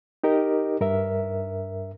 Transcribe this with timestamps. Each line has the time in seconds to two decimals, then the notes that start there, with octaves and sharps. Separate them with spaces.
0.24 D#4 G4 A#4 D#5
0.81 G2 A#4 E5